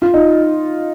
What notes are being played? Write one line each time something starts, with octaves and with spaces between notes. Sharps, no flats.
F4
D#4